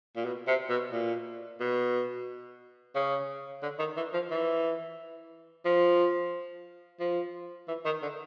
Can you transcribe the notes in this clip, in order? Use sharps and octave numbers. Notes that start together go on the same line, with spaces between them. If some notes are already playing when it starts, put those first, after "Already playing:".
A#2
B2
C3
B2
A#2
B2
C#3
D3
D#3
E3
F3
E3
F3
F3
E3
D#3
D3